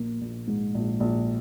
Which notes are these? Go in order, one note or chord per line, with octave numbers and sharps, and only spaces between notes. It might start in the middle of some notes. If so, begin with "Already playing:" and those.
Already playing: A#1 A#3
A#1
G#2
A#1
A#1